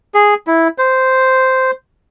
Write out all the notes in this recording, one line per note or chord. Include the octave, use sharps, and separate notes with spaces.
G#4
E4
C5